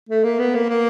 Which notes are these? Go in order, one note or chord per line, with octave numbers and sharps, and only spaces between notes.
A3
A#3
B3
A#3
A#3